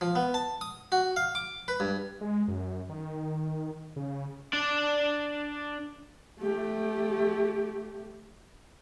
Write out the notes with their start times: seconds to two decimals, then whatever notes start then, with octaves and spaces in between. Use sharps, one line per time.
0.01 F3
0.15 B3
0.34 A5
0.61 D#6
0.92 F#4
1.16 F5
1.35 D6
1.68 B4
1.80 G2
2.21 G#3
2.48 F#2
2.89 D#3
3.96 C#3
4.53 D4 D5
6.39 A3 G4